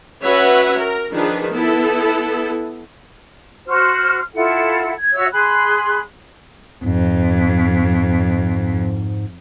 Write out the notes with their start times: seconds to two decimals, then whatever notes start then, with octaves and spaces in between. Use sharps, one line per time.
0.23 C#4 F#4 B4 C#5 E5 F#5
0.77 A#4
1.13 D#3 F3 D4 G#4 B4
1.52 B3 E4 A4
3.67 F#4 C5 F6
4.34 E4 F4 A4 F#5
4.98 G#6
5.14 F#4 C#5 E5 E6
5.32 G#4 B5 C6 F#6
6.84 F2 G#2